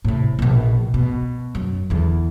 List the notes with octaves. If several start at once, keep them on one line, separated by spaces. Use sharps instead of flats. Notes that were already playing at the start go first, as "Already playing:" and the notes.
A2 C3
A#1 B2
B2
F#2
E2 D3